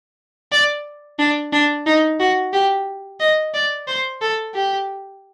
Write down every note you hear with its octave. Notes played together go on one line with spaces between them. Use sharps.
D5
D4
D4
D#4
F#4
G4
D#5
D5
C5
A4
G4